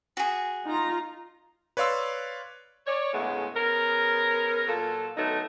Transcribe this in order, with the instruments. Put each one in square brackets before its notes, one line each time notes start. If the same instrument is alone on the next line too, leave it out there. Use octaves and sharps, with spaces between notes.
[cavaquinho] F#4 G#4
[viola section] D#4 F4 A#5
[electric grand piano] B4 C#5 D5 F5 C6 E6
[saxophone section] C#5 D5
D2 A2 C#3 G#3 A3 B3
B3 C#4 G#4 A#4
A#2 F#3 F4 A4
D3 D#3 F#3 A3 B3 D#4